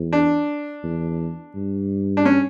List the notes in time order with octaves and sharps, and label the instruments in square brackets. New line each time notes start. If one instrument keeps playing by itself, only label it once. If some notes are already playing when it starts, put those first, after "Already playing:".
Already playing: [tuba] E2
[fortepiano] D4
[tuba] E2
G2
[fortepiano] D4
C#4